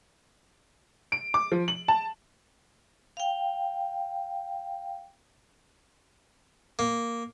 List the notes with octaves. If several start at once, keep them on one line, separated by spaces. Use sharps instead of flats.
D7
D6
F3
F#7
A5
F5 G5
A#3